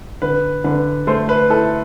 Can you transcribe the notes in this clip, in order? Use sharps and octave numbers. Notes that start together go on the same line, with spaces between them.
D3 B4
D3 B4
A3 C5
B4
E4 A4